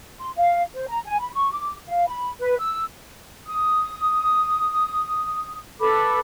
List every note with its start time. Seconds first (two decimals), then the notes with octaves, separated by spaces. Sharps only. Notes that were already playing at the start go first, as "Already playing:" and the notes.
0.19 C6
0.37 F5
0.75 C5
0.89 A#5
1.05 G#5
1.19 B5
1.34 C#6
1.52 D6
1.88 F5
2.08 B5
2.41 B4
2.59 E6
3.46 D#6
5.80 A4 B4 B5 D6